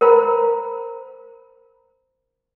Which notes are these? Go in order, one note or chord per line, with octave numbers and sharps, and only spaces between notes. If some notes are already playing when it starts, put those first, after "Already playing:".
A#4 C5 A#5 B5